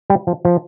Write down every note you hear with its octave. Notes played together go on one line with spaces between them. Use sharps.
G3
F3
F3